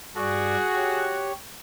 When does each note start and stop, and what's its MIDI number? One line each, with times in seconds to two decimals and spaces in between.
0.16 0.56 43
0.16 1.30 66
0.16 1.06 68
0.16 0.56 74
0.74 1.32 67
0.74 1.32 73